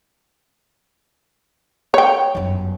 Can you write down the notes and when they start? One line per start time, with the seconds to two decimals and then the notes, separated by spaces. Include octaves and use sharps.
1.94 C#5 G5
2.35 G1 F#2